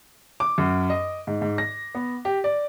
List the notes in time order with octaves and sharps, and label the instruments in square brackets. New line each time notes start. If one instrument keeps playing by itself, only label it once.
[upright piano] D6
F#2
D#5
G#2
G#2
A#6
B3
G4
D5